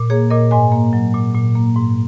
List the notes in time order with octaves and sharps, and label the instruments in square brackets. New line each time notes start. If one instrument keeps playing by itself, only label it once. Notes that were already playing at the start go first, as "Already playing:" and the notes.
Already playing: [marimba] A#2
A#3 G#4 C#5
A#2 A#4 D#5
G#2 D#5 G#5
A#3
F#3
A#2
A#2
A#3
G#2